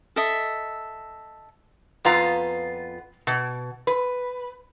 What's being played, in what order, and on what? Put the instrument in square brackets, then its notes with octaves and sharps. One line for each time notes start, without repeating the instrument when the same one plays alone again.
[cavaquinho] A4 D#5 E5
[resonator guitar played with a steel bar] F2 B3 F4 A#5
B2
B4